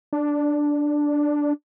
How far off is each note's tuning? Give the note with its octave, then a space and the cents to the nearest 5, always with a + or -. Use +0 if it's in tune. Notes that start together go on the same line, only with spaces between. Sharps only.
D4 +0